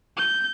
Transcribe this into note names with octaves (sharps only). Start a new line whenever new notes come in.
G6